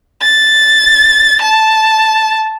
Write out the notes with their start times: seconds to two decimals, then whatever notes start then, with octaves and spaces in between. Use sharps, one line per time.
0.21 A6
1.42 A5